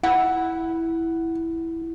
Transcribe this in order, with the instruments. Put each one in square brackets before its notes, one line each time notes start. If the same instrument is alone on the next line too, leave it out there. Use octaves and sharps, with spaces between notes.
[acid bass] E4 [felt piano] F#5